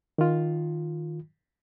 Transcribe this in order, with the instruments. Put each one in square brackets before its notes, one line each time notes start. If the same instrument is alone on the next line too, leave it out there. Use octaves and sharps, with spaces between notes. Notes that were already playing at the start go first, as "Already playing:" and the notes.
[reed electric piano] D#3 F4